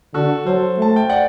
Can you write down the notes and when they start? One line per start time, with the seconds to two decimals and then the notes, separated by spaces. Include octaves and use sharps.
0.14 D3 F#4 A4
0.46 F#3 A4 C5
0.78 A3 A5
0.96 G5
1.09 D5 F#5